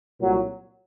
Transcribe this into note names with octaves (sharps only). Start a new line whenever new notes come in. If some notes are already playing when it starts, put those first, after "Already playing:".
C2 A#2 F#3